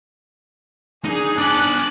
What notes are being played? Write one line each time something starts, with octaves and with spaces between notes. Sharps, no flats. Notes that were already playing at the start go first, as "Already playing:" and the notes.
D4 D#4 G#4
D4 G#5 A5 D6 F#6